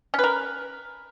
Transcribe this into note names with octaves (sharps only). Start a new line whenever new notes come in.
C#4 A#4 B4